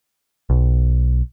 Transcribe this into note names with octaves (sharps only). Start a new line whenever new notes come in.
B1